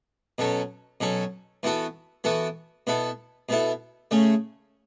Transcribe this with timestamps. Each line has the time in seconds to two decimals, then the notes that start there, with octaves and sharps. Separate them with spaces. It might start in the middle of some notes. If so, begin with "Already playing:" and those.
0.38 B2 F#3 C#4 A4
1.01 B2 F#3 C#4 A4
1.63 E3 B3 F#4 A4
2.24 E3 B3 F#4 A4
2.87 B2 B3 E4 A4
3.49 B2 B3 E4 A4
4.11 C#3 A3 C#4